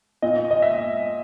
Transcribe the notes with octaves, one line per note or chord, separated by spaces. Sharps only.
A#2 D#5
D#5
E5